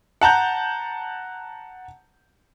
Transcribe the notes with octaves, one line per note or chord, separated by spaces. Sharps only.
F#5 A5 A#5 G6